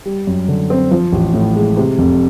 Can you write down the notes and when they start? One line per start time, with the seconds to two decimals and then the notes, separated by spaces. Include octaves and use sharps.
0.06 G3
0.27 F#2
0.48 D3
0.70 C4
0.91 F3
1.13 A1
1.34 A2
1.56 G#3
1.77 C3
1.98 F1